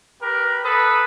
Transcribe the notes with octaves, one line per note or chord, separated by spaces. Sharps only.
G4 A#4 B4
A4 B4 D#6